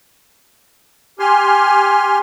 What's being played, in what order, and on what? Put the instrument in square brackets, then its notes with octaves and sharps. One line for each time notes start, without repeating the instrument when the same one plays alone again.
[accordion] G4 G#5 C6 F6